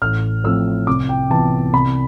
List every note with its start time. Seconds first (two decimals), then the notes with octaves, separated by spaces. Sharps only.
0.02 A1 F6
0.44 A2 F3 C4 E6
0.87 C2 D6
1.09 G5
1.30 C3 E3 B3 A5
1.73 C2 B5